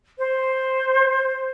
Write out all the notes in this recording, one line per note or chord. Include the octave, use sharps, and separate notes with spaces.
C5